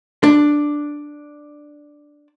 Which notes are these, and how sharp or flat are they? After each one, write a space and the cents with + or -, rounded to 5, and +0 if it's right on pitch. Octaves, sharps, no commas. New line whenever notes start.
D4 +5